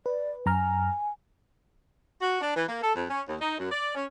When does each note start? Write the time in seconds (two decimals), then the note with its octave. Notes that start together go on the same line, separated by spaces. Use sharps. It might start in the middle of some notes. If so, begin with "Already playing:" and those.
0.06 B4 D5
0.46 F#2 G#5 A#5 F6
2.21 F#4
2.41 D4
2.55 E3
2.69 A#3
2.83 A4
2.95 F2
3.09 C#4
3.27 D#2
3.41 D#4
3.58 F#2
3.71 D5
3.95 C#4